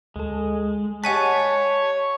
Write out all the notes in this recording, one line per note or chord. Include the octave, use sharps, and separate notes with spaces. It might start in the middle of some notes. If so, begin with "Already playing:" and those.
D2 G#3 A4
G4 C#5 D#5 F#5 G#5 A5 F#6 B6